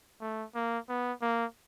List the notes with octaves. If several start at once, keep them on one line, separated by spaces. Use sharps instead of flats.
A3
A#3
B3
A#3